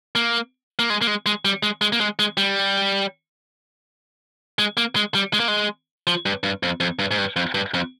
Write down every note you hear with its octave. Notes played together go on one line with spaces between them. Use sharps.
A#3
A#3
G#3
A#3
G#3
G#3
G3
G#3
G#3
A#3
G#3
G#3
G3
G#3
A#3
G#3
G3
G#3
A#3
G#3
F3
G2
G2
F2
F2
G2
G#2
G2
F2
G2
F2